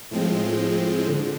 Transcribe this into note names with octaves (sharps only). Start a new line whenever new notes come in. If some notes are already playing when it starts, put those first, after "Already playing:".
A2 F3 G#3 C4
D3